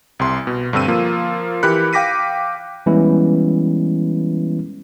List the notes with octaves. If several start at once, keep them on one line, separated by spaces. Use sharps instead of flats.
C2 C3 C6
B2
G2 D3 C4 E6 D#7
F3 A#3 F4
E3 G4 A#4 B5 F#6 C#7
F5 G5 D6 A#6 B6 D#7
E3 G3 G#3 B3 C#4 E4